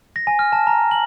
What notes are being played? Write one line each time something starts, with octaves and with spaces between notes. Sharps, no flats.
A#6
G#5
F6
A5
A#5
F#7